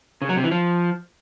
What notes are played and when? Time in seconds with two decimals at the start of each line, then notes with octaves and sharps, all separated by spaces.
0.22 C#3
0.29 F#3
0.36 C3
0.44 E3
0.51 F3